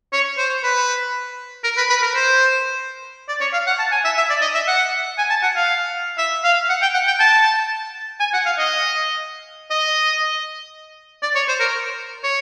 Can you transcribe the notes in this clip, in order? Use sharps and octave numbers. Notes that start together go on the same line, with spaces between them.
C#5
C5
B4
A#4
B4
B4
A#4
C5
D5
C#5
F5
F#5
A5
G#5
E5
E5
D5
D#5
E5
F#5
G#5
A5
F#5
F5
E5
F5
F#5
G5
F#5
G5
A5
G#5
F#5
F5
D#5
D#5
D5
C#5
C5
A#4
C#5